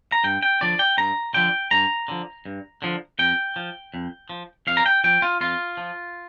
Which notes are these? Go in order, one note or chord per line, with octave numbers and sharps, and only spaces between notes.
A#5
G2 G5
G5
D3 F3 D5
G5
G2 A#5
D3 F3 G5
G2 A#5
D3 F3
G2
D3 F3
F2 G5
F3
F2
F3
F2 F5
A#5
G5
F3 G5
F4
F2 F4
F3